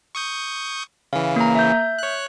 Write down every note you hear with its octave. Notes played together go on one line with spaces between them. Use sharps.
C#6 D#6 G6
C#3 E3 F5
A#3 A#5
E5 G6
C#5 F#6